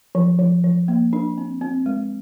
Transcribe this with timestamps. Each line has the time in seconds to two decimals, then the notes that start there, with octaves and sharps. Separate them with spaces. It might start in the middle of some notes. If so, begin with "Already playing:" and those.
0.15 F3
0.39 F3
0.64 F3
0.88 A#3
1.13 D4
1.38 C4
1.61 C4
1.86 G#3